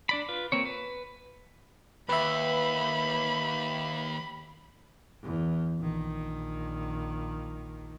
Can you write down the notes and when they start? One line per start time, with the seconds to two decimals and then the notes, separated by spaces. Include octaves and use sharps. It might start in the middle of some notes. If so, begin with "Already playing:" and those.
0.09 D4 D5 B5
0.29 F4 B4
0.52 A#3 C4 C#5
0.65 B4
2.09 D#2 B4 E5 B5
5.23 E2
5.78 A#1 D#3